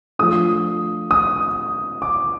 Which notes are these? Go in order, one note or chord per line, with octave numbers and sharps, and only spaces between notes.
F3 A3 D4 D#6
D#6
D6